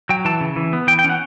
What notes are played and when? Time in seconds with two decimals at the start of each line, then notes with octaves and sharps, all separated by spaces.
0.09 F#3 G5
0.25 E3 A5
0.41 C#3
0.56 E3
0.73 B3
0.87 E3 G5
0.99 G5
1.04 C#4
1.10 F#5